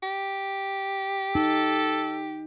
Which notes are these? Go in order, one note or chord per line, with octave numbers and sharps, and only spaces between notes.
G4
D#4 A4